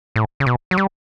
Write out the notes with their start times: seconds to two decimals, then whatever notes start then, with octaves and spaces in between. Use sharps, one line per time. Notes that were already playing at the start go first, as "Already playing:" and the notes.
0.16 A2
0.40 C#3
0.46 B2
0.71 F#3
0.78 G3